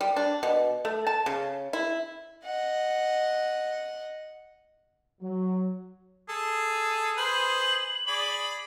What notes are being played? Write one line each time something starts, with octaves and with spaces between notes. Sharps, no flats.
G3
D4
B2
A3
A5
C#3
E4
D#5 F#5
F#3
G#4 A4
B4 C5 F#7
G#4 D5 B5